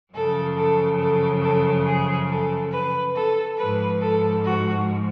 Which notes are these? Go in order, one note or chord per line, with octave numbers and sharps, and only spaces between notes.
F#2 C#3 F3 A4
A4
A4
A4
G#4
A4
B4
A4
G#2 F3 B4
A4
F#4